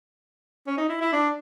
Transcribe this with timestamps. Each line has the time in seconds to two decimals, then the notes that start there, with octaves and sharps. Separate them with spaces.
0.67 C#4
0.78 D#4
0.89 E4
1.01 E4
1.13 D4